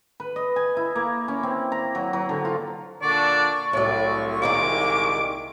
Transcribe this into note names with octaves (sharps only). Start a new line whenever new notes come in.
B4
D#5
G#5
E4
A#3
C#4
C4
A#5
F#3
F#3
D3
F4
A#2 D3 D4 D5 C#6
C2 A2 F#3 D5
A#2 D#3 G#3 D6